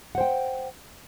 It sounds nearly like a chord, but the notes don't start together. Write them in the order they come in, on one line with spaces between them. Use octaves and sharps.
F#5 C5 G5